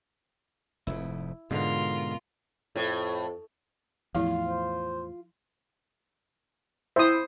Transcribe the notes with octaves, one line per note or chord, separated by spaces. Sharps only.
F1 F2 G#2 E4
G#2 B2 D3 G#3 F4 A#4
F2 A2
E2 A2 F3 E4 F4
C5
E4 C5 D#6